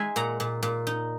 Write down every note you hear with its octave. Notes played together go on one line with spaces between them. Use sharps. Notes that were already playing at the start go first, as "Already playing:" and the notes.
Already playing: G#3 D#4 E5 G#5
A#2 F#5 A#5
A#2
A#2
D#4